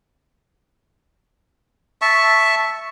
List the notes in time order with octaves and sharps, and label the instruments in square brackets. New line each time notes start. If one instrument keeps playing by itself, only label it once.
[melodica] E5 A5 C#6